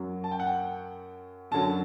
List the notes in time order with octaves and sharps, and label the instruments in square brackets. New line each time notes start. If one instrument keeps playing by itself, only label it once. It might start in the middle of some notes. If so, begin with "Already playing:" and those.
Already playing: [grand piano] F#2 F#3
A5
G5
F#5
G5
F#2 D3 F#3 A5